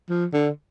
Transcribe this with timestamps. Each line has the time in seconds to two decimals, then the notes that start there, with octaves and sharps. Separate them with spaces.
0.09 F3
0.33 D3